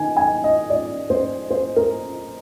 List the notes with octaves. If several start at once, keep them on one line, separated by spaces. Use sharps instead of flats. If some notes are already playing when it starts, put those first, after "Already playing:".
Already playing: D#3 G#5
G#5
D#5
D5
C5
C5
A#4